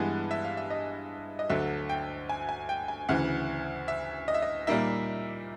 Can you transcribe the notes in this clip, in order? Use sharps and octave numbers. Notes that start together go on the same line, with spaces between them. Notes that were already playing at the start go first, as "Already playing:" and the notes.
Already playing: G2 E3 G#3 B3
E5
F5
E5
D#5
D#5
D2 D3 F#3 E5
G5
G#5
G#5
G5
G#5
D2 C#3 E3 F#5
E5
D#5
E5
D#5
A#2 G3 A#3 D#4 E5